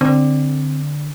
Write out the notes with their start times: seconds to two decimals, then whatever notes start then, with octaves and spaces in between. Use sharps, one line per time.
0.01 D3 C4